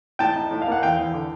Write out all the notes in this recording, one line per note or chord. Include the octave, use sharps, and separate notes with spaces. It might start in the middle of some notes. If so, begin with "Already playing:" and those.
A2 G5 A5
D#4
A2
F5
A#3 F#5
E2 F5 G5
E2
D3